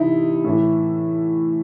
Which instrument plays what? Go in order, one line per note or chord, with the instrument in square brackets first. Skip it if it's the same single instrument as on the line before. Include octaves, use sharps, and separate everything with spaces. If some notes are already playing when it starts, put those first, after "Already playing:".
Already playing: [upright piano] C3 E3 D#4 E4
A2 E3